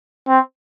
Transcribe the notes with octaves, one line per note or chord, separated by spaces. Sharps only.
C4